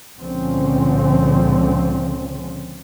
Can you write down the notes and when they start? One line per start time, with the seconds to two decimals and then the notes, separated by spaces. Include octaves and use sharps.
0.18 C#2 A#2 D3 F3 C4 C#4